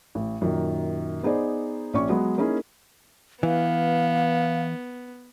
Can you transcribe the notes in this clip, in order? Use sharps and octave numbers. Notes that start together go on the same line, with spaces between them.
A1
F#2 A#2 D#3
B3 D#4 G#4 C5 D5
A#1 C#4 D5 C#6
F#3 G#3 B3
A#3 C#4 D#4 E4 G#4
E3 B3 F5